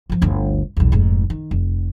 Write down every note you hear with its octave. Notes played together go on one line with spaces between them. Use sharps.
G#1 F3
G1 D2
B1 E2
F1 G#2
D#3
F1